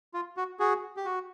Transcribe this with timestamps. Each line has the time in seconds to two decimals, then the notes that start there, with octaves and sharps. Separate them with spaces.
0.14 F4
0.37 F#4
0.59 F#4 G#4
0.97 G4
1.05 F#4